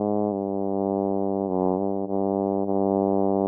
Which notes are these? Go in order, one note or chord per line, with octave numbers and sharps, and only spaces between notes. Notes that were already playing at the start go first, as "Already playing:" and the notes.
Already playing: G#2
G2
F#2
G2
G2
G2